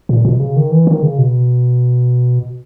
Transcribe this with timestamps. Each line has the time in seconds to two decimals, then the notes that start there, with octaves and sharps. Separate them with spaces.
0.09 A#2
0.25 B2
0.40 C#3
0.56 D#3
0.71 E3
0.87 D#3
1.03 C#3
1.18 B2